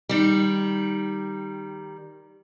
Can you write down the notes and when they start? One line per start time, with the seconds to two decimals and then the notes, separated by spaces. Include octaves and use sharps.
0.09 D#3 G3